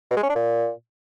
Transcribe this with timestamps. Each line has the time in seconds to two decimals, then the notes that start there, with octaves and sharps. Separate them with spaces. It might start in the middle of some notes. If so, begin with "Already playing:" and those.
0.11 B2
0.17 G#3
0.23 C#4
0.29 D4
0.35 A#2